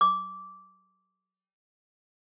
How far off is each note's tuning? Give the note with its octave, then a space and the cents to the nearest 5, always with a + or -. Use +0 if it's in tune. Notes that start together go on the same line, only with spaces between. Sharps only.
D6 -15